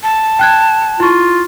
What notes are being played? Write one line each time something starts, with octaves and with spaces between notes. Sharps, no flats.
A5
G5 F#6 G#6
E4 F4 C#6